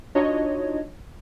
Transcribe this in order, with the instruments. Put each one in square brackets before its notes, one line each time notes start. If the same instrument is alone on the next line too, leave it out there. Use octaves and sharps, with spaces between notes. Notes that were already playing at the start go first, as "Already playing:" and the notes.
[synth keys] D4 D#4 F4 F#4 C#5 D#5